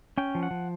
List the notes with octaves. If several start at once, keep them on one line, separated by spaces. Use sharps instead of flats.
C#4 G5
F3
F#5
F3